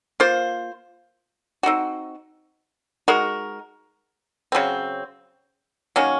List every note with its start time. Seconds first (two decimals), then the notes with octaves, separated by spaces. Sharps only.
0.20 A#3 F4 C5
1.63 C4 D#4 F#4
3.08 G#3 D#4 F#4 A#4
4.52 C#3 F#3 C4
5.96 D#3 F#3 A#3 C#4